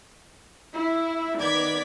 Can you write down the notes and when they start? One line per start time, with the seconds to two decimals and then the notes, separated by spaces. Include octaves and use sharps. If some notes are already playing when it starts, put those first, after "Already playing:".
0.74 E4
1.38 D#3 B3 D5 D6 G#6 B6